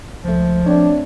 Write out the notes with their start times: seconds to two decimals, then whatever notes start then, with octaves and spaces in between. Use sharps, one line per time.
0.24 C#2 F3 A3
0.66 A3 C4 D4 C#5